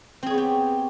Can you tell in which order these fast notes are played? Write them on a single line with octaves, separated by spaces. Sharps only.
C4 G#4 C#5 B3 G4